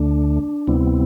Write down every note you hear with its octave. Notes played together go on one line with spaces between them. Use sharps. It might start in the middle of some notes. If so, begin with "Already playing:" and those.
Already playing: D2 D3 A3 D4
D2 C3 G3 B3 C4 E4